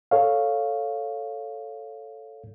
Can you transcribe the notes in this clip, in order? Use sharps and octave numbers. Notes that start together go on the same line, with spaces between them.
A4 C#5 F5